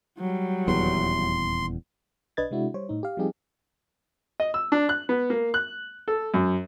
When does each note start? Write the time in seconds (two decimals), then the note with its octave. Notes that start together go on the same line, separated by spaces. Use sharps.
0.19 F#3 G3
0.68 D#1 E2 C6
2.37 B1 D4 B4 D#5 G#6 A6
2.51 C3 G#3 D4 E4 F#4
2.74 G3 C5 C#5
2.89 A2 D#4
3.03 G4 F5
3.17 F3 G3 C4 D#4 G4 G#4
4.40 D#5
4.54 E6
4.72 D4
4.89 F#6
5.09 B3
5.30 A#3
5.54 F#6
6.08 A4
6.34 F#2